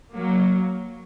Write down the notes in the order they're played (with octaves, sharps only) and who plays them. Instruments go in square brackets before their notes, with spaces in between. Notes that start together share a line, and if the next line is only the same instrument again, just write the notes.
[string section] F#3 A#3